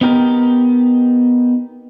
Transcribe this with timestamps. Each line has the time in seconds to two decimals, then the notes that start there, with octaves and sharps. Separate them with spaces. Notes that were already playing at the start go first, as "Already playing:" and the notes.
0.01 B3 D#4 G4 A#4